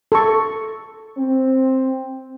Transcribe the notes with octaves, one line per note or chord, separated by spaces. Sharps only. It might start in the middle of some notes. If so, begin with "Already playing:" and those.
A4 C#6
C4